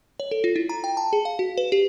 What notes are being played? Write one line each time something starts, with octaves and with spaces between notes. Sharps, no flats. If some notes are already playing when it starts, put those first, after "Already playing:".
C#5
A4
F4
E4
A#5
G5
A5
G#4
F5
F#4
B4
G4